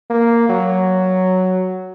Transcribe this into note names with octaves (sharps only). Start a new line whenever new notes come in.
A#3
F#3